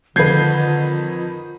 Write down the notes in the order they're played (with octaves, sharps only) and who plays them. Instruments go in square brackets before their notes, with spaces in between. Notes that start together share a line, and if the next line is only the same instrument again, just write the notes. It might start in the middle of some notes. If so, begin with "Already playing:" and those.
[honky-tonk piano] F2 D#3 B4 [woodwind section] D3 [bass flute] F4 [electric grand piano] G6 G#6 C7